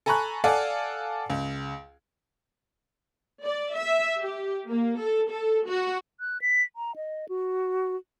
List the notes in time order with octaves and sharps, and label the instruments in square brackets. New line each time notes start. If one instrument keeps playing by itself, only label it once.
[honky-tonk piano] A4 G#5 A#5 B5 C#6 F#6
A4 D5 F5 F#5 G#5
C#2
[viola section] D5
E5
G4
A#3
A4
A4
F#4
[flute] F#6
B6
A#5
D#5
F#4